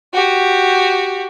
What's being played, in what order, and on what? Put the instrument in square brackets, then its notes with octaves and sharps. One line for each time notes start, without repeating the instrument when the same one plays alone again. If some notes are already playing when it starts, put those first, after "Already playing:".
[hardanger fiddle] F#4 G4